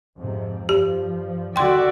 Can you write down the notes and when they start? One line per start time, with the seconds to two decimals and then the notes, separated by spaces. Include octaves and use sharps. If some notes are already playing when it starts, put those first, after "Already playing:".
0.17 F2 G#2 C3
0.69 G2 F3 G4
1.56 D#2 D3 G3 F#4 D5 E5 G5 C6